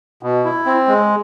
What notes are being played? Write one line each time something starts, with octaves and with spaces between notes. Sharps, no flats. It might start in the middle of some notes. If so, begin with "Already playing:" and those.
B2
E4
C4
G#3